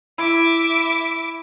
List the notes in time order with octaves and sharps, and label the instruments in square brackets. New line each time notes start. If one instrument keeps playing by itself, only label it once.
[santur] E4 [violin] E5 D6